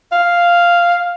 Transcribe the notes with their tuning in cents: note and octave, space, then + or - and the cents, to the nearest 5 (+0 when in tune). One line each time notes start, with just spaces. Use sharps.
F5 -5